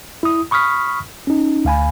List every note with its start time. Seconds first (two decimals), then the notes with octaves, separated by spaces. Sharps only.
0.23 E4 D#6
0.51 B5 C#6 D#6 F6 B6
1.27 C#4 D#4
1.65 D2 F5 G#5 B5